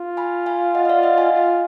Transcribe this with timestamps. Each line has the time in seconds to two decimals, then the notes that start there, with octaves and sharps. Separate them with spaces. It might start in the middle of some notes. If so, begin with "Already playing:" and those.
Already playing: F4
0.17 G#5 B5
0.46 F5 G#5
0.75 D#5 F#5
0.85 D#5
0.89 D5 F5
1.03 D#5 F#5
1.18 F5 G#5
1.32 F4